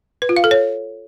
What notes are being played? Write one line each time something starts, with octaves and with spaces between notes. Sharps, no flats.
B4
F4
F5
A4
C#5